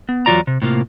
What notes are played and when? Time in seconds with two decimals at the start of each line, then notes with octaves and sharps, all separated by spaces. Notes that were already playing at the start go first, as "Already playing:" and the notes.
0.09 B3
0.26 E2 F#3 G#3 F4 D5 A#5
0.47 C3
0.62 A2 C3 A#3 F4